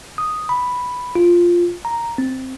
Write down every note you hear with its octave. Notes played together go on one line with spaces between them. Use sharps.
D#6
B5
F4
A#5
C4